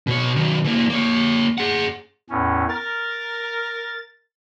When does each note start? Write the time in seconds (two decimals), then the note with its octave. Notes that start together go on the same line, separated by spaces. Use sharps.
0.07 B2 C#5
0.36 D#3 F#3
0.65 E3 A#3
0.90 A#3 C#5
1.58 G#4 F#5
2.30 E2 A2 C#4
2.69 A#4 A6